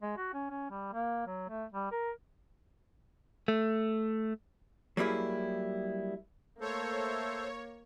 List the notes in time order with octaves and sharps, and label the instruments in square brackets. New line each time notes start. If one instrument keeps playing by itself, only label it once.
[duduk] G#3
F#4
C#4
C#4
G3
A#3
F#3
A3
G3
A#4
[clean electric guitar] A3
[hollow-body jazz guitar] F#3 G3 A#3 E4 G#4
[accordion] A3 A4 C5 [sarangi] A#3 [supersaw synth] C#5